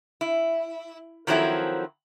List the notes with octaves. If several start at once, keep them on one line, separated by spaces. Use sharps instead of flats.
E4
D#3 F3 F#3 C4 E4 A4